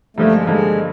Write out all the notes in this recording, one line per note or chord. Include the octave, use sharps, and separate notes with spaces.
G2 D3 F3 A3 A#3
G#3
G2 D3 F3 G#3 A#3